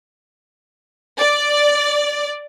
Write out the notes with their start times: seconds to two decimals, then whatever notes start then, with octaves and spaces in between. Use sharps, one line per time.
1.18 D5